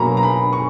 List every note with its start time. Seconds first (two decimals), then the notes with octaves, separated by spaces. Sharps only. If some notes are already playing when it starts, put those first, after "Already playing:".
Already playing: B2 F#3 A#3 A#5 B5 C#6
0.17 A#5
0.23 B5
0.53 C#6